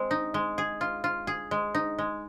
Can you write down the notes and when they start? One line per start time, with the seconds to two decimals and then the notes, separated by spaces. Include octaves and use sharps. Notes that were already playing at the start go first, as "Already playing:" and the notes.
Already playing: G#3 C4
0.11 D#4
0.34 G#3
0.58 G#4
0.81 F4
1.04 F4
1.27 G#4
1.51 G#3
1.75 D#4
1.99 G#3